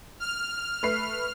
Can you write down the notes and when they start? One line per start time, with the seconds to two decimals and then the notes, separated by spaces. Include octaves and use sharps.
0.20 F6
0.83 A3 B4 C7